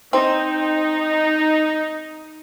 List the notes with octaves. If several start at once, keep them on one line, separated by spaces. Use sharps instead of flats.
C4 D#4